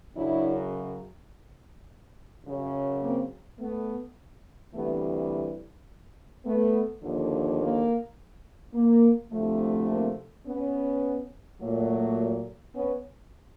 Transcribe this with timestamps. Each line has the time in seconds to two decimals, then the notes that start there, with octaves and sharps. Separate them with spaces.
0.16 F#2 C#3 F#3 D4 E4
2.45 F#2 C#3 F#3
3.02 A#3 C4
3.59 A3 B3
4.73 D2 C3 E3 G3 A3 B3
6.45 A3 B3
7.03 D#2 D3 F3
7.60 A#3
8.74 A#3
9.32 D2 C3 F3 A3
9.89 A#3 C4
10.47 B3 C#4
11.61 A#2 F#3 A3
12.75 B3 C#4